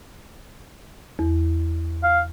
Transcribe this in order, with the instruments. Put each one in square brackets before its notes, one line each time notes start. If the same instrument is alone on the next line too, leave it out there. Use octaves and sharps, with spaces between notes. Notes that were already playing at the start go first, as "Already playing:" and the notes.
[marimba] E2
[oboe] F5